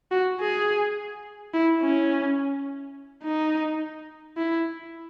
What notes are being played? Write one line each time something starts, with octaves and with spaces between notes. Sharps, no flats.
F#4
G#4
E4
C#4
D#4
E4